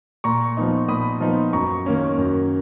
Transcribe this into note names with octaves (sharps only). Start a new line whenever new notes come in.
A#2 A#5 C#6
F3 B3 D#4
A#2 B5 D#6
F3 B3 D#4
F#2 A#5 C#6
D#3 A#3 C#4
F#2